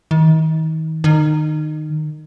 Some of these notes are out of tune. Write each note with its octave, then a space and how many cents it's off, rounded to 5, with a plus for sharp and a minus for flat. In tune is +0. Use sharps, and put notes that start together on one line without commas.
D#3 +35
D#3 -20